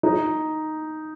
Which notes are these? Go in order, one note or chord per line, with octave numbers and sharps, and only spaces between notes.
D#4